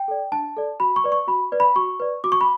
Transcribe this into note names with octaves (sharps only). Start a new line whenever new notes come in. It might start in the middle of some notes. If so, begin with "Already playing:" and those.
Already playing: G5
A4 D5
D4 A5
A4 D5
F#4 B5
C#6
B4 D5
C#6
F#4 B5
B4 D5
B5
F#4 C#6
B4 D5
F#4 D6
C#6
B5